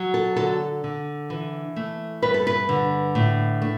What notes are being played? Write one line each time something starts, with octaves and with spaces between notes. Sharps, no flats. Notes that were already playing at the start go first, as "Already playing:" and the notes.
Already playing: F#3
A4
D3 A4
D3
E3
A3
G2 B4
A4
B4
D3
A2
A3